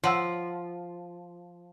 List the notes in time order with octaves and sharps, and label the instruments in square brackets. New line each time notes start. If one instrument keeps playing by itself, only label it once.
[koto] F3 [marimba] C#5 F#5 E6